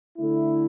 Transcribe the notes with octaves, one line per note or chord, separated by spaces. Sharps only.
D3 A3 E4